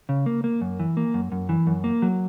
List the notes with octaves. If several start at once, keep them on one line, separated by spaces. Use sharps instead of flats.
C#3
A#3
A#3
F#2
E3
A#3
F#2
F#2
E3
F#2
A#3
F#3